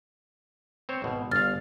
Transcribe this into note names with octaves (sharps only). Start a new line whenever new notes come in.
C4 C5 C#5
G#1 B2
G1 F5 F6 A6